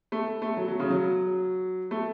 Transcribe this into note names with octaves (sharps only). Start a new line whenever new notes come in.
A3
A3
F#3
F#3
C#3
F#3
A3